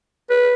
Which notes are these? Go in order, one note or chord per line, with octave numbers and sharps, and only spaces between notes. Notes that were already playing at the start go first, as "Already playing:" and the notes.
B4